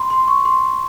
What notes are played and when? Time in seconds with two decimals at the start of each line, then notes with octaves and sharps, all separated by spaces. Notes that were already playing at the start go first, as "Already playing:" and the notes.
Already playing: B5 C6
0.10 C6
0.28 C#6
0.45 C6